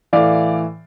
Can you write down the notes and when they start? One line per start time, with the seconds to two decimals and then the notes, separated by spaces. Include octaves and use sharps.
0.13 A2 E3 D5 F5